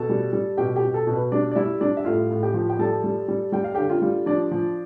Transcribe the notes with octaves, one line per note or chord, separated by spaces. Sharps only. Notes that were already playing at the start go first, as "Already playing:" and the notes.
Already playing: B2 A4 A5
G3
G3
B2 G4 G5
G4 G5
B2
A4
B2
B4
G3 D4 D5
D5
G3 E4 E5
G3 D4 D5
E5
A2 F4 F5
A2
G4 G5
F3
G5
G3 A4 A5
G3
G3
G3 G5
F5
D3 G4 G5
F4 F5
G3
F3 D4 D5
F3